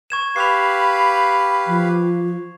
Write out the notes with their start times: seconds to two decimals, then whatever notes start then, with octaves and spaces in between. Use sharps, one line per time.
0.10 C#6 G#6 E7
0.36 G4 B4 F5 B5 C7 F7
1.67 F3